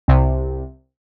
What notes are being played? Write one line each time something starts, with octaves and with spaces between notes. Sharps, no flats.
C2 C3